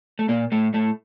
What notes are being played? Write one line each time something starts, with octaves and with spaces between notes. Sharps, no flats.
A3
A#2 A#3
A2 A3
A2 A3